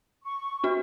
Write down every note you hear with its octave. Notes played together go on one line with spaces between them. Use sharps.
C#6
D4 F#4